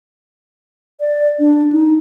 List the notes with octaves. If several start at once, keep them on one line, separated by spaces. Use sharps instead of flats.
D5
D4
D#4